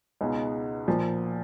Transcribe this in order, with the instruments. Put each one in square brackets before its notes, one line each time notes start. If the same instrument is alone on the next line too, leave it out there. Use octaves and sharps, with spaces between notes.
[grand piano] C#2 B2 G#3 D#4
A#2 F3 A#3